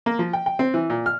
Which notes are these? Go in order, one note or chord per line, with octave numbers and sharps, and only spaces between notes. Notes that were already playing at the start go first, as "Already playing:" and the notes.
A#3
F3
G5
G5
C4
E3
A#2
F6